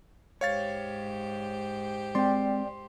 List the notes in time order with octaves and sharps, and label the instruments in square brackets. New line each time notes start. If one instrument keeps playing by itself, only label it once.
[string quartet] G#2 G4 C5 [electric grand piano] C#5 F5 A6
[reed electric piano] G#3 C4 [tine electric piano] D5 G5 [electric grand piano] C6